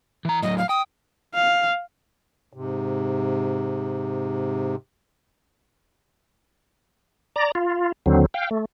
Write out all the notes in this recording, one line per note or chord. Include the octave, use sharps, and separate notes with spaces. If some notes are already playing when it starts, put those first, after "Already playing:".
E3 A#5
A2 F#3 D#5
F5
G5 D#6
F5
G#2 C3
D5 A#5
F4
D#2 D3 F#3 C4
F5 G5
A3